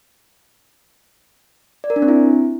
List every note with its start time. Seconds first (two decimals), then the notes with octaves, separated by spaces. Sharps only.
1.84 D5
1.90 A#4
1.96 D4
2.02 C4
2.08 E4